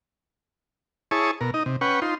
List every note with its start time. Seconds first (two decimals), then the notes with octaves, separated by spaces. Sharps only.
1.11 E4 G#4 C#5 A5 C#6 D#6
1.41 B2 A#4
1.54 D#4 D#5
1.66 C3
1.81 C#4 B4 F#5 G5 C#6
2.02 D#4 F4 C6